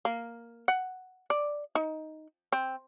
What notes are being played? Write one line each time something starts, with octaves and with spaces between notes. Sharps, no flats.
A#3
F#5
D5
D#4
C4